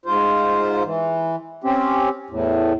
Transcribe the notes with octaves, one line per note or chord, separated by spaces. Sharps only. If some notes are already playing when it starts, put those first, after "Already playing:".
G#2 F4 C5
E3
C4 C#4 G4
E2 A2